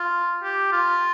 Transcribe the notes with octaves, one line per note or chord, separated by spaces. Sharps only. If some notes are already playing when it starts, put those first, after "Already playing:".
Already playing: F4
G4
F4